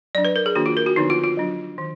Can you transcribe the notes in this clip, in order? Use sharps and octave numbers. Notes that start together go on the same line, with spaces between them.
F#3 D4 D5
B4
A#4
G#4
D#3 A#3 D4 F#4
F4
A#4
F#4
D3 F3 B3 D4 D#4
F4
F4
F#3 D4
D#3